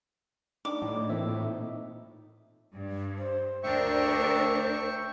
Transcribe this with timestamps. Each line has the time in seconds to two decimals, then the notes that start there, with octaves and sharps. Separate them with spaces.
0.65 D4 D#4 D6
0.82 A2
1.09 A#2 E3 C4 E5
1.40 D#4
2.73 G2
3.18 C5
3.63 D2 D4 A#4 E5 G5 C#6